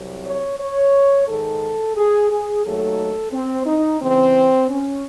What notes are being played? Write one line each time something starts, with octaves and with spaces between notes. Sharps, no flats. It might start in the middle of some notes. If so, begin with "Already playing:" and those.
Already playing: C2 C3 F#3
C#5
C#5
G#2 D#3 G#3 A4
G#4
G#4
D#2 D#3 F#3 A3 A4
C4
D#4
C#2 C#3 E3 C4
C#4